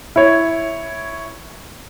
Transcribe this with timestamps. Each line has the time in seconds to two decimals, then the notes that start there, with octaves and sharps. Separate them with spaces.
0.16 E4 C#5